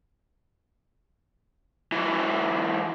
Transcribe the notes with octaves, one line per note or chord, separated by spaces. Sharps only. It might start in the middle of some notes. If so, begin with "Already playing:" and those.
E3 F#3